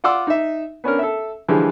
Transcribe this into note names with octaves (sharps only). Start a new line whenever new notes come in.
F4 D5 F#5 C6 D6 E6
D#4 E5
B3 C#4 D4 A#4
A4 E5
D3 E3 F3 G3 G#3